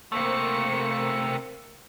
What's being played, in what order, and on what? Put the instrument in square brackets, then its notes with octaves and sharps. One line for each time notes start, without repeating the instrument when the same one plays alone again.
[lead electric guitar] C3 A3 [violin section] A#3 C5 C#7